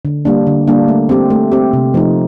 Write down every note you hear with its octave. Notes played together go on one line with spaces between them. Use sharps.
D3
G3 A#3 D4
D3
G3 A#3 D4
A3
C4 G4
A3
C4 G4
C3
F3 A3 D#4